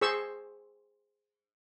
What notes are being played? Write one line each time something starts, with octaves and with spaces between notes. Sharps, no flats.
G#4 C5 C#6 E6